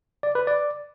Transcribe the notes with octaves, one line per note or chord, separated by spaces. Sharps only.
D5
B4
D5